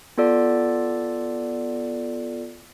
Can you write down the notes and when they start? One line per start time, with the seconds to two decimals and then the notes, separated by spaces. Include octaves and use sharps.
0.18 B3 F4 A4 D5